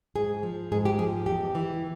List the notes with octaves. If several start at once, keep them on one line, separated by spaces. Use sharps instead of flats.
G#2 G#4
F3
G#2 G#4
G4
F3 G#4
E2 G4
E3